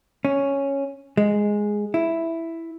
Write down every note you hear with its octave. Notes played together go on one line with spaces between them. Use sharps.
C#4
G#3
E4